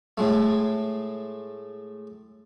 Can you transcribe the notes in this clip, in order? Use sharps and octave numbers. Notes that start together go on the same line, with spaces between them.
A2 G#3 A3